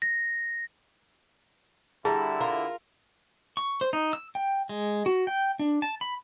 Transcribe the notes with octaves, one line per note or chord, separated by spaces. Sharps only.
A#6
D3 G3 E4 G#4 A5 A#5
F4 A#4
C#6
C5
D#4
E6
G5
G#3
F#4
G5
D4
A5
B5